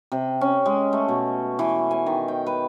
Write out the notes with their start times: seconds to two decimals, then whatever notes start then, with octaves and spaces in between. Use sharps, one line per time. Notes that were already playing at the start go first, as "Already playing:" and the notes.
0.12 C3
0.41 C#4
0.66 G#3
0.93 A3
1.08 B2
1.59 E3
1.91 G#5
2.06 D#3
2.28 G5
2.46 B4